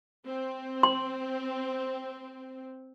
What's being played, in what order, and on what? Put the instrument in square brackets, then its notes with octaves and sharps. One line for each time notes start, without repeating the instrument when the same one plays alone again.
[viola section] C4
[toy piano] C6